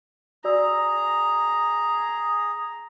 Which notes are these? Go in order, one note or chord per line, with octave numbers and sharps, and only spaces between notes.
F#4 G#4 D5 A#5 E6